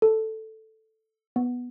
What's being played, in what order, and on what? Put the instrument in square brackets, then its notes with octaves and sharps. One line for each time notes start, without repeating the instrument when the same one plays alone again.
[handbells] A4
B3